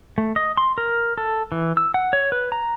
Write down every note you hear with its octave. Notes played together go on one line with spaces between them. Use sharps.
A3
D#5
C6
A#4
A4
E3
E6
F#5
C#5
B4
A#5